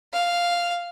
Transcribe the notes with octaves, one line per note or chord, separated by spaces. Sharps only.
F5